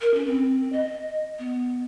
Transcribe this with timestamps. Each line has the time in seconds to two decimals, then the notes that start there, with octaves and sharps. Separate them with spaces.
0.01 A#4
0.14 C#4
0.27 C4
0.73 D#5
1.39 B3